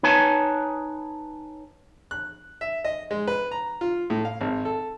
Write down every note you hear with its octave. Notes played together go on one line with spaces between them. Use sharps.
D#4 B4 C#5 G#5 A5
F#6
E5
D#5
G#3
B4
A#5
F4
A2
F5
G#1
A4